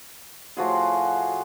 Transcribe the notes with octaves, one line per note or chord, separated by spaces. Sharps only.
A2 F3 F#4 G#4